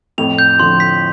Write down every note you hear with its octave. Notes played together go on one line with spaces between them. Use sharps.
F2 A2 F7
G6
D3 F3 C6
B6